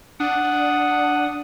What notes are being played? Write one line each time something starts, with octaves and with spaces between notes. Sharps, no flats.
D4 F#5 D#6